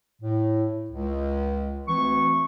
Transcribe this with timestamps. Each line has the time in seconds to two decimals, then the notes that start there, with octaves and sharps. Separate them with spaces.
0.22 A2
0.91 C#2
1.88 D2 E3 C4 C#6